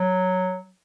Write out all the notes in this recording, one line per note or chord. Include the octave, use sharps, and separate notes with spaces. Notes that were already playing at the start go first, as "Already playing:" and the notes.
Already playing: F#3